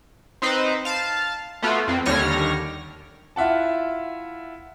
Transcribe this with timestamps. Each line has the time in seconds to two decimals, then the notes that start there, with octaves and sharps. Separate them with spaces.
0.42 C4 D#4 B4 C5
0.85 F5 A5
1.62 A3 B3 F4 F#4
1.88 F2 C4
2.06 D#2 D3 G3 C#5 F6 A#6
3.36 E4 F4 E5 F#5 A5